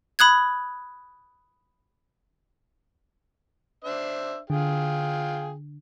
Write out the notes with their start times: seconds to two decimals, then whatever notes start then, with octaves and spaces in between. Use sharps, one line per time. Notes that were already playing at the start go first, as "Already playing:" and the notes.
0.19 B5 D#6 F#6 G#6
3.84 D4 C5 E5
4.50 D3 F4 G#4 G5